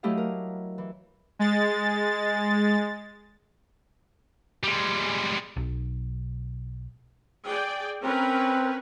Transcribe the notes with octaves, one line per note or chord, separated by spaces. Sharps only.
F#3 A3 E4 G4 D#5 F5
A#4
E3
G#3 A6
G3 G#3
B1
G#4 D5 G5
C4 C#4 A#4 B4